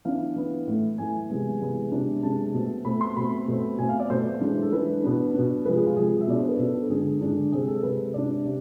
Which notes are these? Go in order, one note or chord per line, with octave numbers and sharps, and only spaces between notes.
E3 B3 D4 F5
E3 B3 D4
A2 E3 A3
A2 E3 A3 G#5
C3 E3 G#3 B3
C3 E3 G#3 B3
C3 G#3 B3 D4
C3 G#3 B3 D4 A5
B2 A3 C4
B2 A3 C4 B5
C6
B2 A3 C4 B5
B2 A3 C4
B2 A3 C4 G#5
F5
D5
B2 A3 C4 C5
E3 G#3 D4
A4
E3 G#3 D4 B4
B2 B3 D4
B2 B3 D4
C3 F3 G#3 B4
G#4
F4
C3 F3 G#3 G#4
E5
B2 B3 D4 D5
C5
B4
B2 B3 D4 A4
A4
D3 G#3 D4 G#4
D3 G#3 D4
C3 G#3 C4 G#4
A4
C3 G#3 C4 B4
C3 G#3 D4 D5
C3